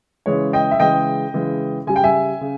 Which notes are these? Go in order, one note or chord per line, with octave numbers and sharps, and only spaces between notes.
C#3 E3 G#3 C#5
D#5 G5
E5
C#3 E3 G#3 D#5 G5
C#3 E3 G#3
C#3 G3 G#5
G5
E5 G#5
C#3